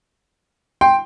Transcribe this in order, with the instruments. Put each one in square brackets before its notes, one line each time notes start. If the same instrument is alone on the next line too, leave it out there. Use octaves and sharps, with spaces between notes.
[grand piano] G5 C6